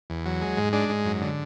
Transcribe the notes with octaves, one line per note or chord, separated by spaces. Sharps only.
E2
F#3
G#3
G#2
G#3 D4
G#2
F#2
D3